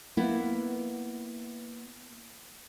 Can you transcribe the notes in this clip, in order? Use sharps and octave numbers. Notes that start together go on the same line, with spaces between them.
A#3 B3 E4